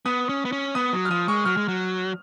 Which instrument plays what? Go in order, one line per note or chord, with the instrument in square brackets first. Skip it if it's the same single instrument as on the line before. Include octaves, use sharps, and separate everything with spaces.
[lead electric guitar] B3 [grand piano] D#6
[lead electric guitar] C#4
B3
C#4
[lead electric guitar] B3 [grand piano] D#6
[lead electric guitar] F#3
[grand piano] F6
[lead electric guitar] F3 [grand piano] D#6
[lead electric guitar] G#3 [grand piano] C#6
[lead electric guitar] F#3 [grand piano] F6
[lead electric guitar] G#3
F#3